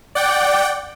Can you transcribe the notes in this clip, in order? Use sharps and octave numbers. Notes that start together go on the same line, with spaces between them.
D5 F#5 G5